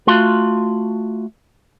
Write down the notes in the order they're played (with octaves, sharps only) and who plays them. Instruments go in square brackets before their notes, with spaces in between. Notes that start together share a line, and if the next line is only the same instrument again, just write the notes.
[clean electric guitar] A3 F4 F#4 F5 C6